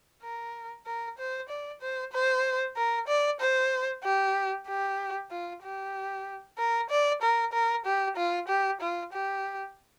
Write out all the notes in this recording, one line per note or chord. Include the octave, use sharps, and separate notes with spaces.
A#4
A#4
C5
D5
C5
C5
A#4
D5
C5
G4
G4
F4
G4
A#4
D5
A#4
A#4
G4
F4
G4
F4
G4